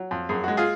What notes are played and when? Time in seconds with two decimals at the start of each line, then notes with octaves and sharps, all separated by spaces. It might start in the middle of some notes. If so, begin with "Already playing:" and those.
Already playing: F#3
0.11 F2
0.29 F#2 G#4
0.44 G#3 F#4
0.57 F4 G#4